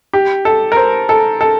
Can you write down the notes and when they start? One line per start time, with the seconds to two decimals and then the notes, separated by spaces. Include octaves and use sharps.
0.13 G4
0.45 A4
0.72 A#4
0.77 C5
1.09 A4
1.41 A4